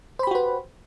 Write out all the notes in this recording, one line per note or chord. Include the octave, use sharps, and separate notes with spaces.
F#4 G4 B4 C5 B5